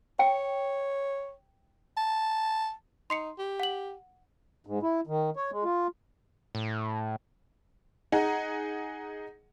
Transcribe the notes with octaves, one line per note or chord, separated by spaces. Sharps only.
C#5 G5
A5
D#4 C6 C7 C#7
G4
F#5 F#7
G#2
E4
D#3
C#5
G#3
F4
A2
D#4 G#4 F#5